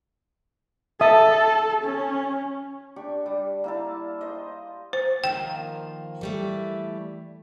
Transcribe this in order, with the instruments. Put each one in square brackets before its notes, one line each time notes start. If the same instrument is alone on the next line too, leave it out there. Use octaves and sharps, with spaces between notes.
[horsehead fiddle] A4 [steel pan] E5 A5 D#6
[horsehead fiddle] C#4
[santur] D4 G4 C#6
G3
A#3 E4 A5
C5 D#5
[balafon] C5
[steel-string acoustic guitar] D#3 F3 A#3 [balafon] G5
[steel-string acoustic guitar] E3 G3 A3